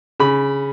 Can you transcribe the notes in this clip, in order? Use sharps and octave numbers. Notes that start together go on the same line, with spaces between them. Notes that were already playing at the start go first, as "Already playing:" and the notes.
C#3 B5